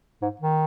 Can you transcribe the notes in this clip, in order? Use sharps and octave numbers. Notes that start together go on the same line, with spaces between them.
G#2
D#3